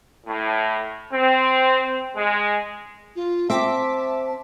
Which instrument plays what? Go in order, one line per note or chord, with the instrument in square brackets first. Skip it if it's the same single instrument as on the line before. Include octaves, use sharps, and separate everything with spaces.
[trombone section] A2
C4
G#3
[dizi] F4
[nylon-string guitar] C4 [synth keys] E5 D6 B6 [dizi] A5